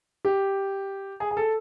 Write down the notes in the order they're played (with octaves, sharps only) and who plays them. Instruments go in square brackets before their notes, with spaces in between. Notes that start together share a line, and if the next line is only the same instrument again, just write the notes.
[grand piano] G4
G#4
G#4
A4